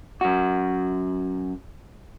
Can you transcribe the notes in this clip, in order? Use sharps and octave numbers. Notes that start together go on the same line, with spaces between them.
F#2 F#4